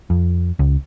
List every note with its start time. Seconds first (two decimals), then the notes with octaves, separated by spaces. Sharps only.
0.10 F2
0.59 C#2